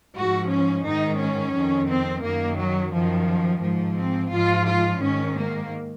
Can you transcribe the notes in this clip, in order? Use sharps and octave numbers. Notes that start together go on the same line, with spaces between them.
G#2 F3 F#4
C#4
G#2 D#3 D#4
C#4
F2 D#3
C4
F#2 D#3 A#3
F#3
F#2 D#3 F3
G#2 F3
C4
G#2 F3 F4
F4
G#2 D#3 C#4
A#3